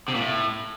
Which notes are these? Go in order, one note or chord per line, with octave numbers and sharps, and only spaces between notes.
C3
A#2
A2